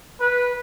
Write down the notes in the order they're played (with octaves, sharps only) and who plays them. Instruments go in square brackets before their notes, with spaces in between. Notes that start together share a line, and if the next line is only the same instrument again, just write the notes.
[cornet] B4